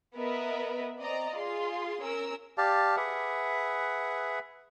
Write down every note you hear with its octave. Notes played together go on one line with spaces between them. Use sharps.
B3 A#4 B4 D#5 E5
C4 D5 D#5 A#5
F4 G#4 C6
C#4 A#4 E6
G4 D5 F5 A5
G#4 B4 E5 F#5